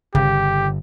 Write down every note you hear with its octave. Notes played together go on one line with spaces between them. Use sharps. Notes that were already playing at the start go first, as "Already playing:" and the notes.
G1 C#3 G4